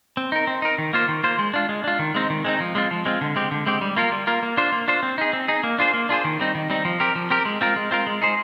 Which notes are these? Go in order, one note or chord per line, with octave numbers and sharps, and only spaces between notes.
C4
D#4 A#4
C4
D#4 A#4
D#3
A#3 F4 C5
D#3
A#3 F4 C5
G#3
D4 F4
G#3
D4 F4
D#3
G#3 C4 D#4
D#3
G#3 C4 D#4
F3
G#3 C4 F4
F3
G#3 C4 F4
D3
G#3 C4 G4
D3
G#3 C4 G4
G3
A#3 F4 A#4
G3
A#3 F4 A#4
A#3
D4 F4 C5
A#3
D4 F4 C5
C4
D#4 G#4
C4
D#4 G#4
A#3
D4 F4 G#4 C5
A#3
D4 F4 G#4 C5
D#3
G3 C4 D#4
D#3
G3 C4 D#4
F3
C4 G4 A#4
F3
C4 G4 A#4
G#3
C4 F4 A#4
G#3
C4 F4 A#4
G#3
D#4 G#4 C5